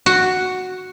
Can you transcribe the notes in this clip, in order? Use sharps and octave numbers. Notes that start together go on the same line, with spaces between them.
F#4